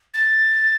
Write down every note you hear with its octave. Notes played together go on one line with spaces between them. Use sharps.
A6